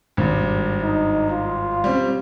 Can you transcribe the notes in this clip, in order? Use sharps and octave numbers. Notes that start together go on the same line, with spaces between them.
G#1 G2
D#4
F4
G3 C4 C#4